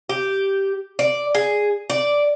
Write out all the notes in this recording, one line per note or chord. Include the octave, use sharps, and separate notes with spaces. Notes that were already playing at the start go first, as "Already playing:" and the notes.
G4
D5
G#4
D5